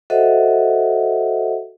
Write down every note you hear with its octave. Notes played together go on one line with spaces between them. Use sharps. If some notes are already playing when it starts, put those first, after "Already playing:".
F#4 A4 C5 D#5 E5 F#5